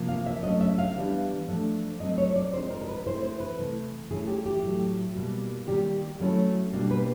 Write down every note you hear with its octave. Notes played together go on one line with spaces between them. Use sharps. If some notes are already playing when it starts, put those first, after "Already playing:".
Already playing: C3 F3 A#3
F5
E5
F#3 A3 C#4 D#5
E5
F5
E3 G3 B3 D4
F3 A3 D4
F#3 A3 C4 D#5
C#5
D5
F3 G#3 C4 D#4 C5
A#4
A#4
B4
E3 A3 C4 E4 C5
C5
B4
C3 E3 A3
E3 A3 C#4 E4 G#4
G4
G4
A2 F#3 A3
B2 G3 A#3
D#3 G3 A#3 G4
F#3 A3 C#4 E4
B2 G3 A#3 D4
B4